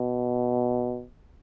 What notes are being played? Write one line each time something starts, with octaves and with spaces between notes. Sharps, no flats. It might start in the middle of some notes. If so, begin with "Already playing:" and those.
Already playing: B2